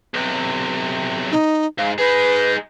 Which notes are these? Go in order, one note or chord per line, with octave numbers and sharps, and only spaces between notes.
B1 C3
D#4
G#2 F5
D#4 G#4 B4